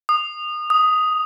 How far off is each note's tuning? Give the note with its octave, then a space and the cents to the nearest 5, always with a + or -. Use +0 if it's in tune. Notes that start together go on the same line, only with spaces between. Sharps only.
D#6 -30
D#6 +5